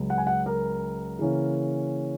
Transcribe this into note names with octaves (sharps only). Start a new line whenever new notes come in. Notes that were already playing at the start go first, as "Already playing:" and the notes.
Already playing: C#2 C#3 F#3
F#5
G#5
F#5
A#4
C#3 E3 A#3 C#4